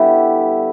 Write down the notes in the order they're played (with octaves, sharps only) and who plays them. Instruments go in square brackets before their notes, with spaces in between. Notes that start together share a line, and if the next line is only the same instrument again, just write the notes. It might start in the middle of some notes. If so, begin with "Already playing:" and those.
Already playing: [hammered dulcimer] D3 G3 B3 E4 G4